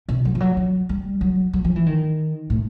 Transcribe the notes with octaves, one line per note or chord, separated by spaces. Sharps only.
C3
F#3
F3
F#3
F#3
G3
F#3
F#3
F3
E3
D#3
A2